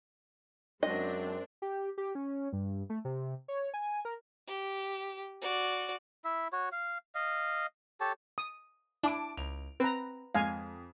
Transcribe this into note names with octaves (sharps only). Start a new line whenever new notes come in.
F#2 F#3 G#3 C4 D4 D#5
G4
G4
C#4
G2
A3
C3
C#5
G#5
A#4
G4
F#4 D5
E4 E5
F#4 C#5
F5
D#5 F5
G4 A4 C#5 A5
D#6
D4 E4 A5 D6 D7
C#2 F7
C4 B4 A#5
F2 G#3 F5 G#5